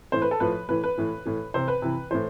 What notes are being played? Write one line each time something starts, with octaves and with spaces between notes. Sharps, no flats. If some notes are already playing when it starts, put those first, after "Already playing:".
A2 E3 C5
B4
A4
A2 F3 B4
A2 E3 B4
B4
A2 E3
A2 E3
C3 E3 C5
B4
C3 E3
A2 E3 C5